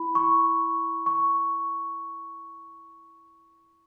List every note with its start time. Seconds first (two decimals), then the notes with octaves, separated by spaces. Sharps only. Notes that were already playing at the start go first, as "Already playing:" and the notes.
Already playing: E4 B5
0.15 C#6
1.06 C#6